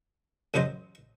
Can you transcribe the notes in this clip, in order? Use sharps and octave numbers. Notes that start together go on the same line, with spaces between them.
A1 F#2 F#3 C5 D#5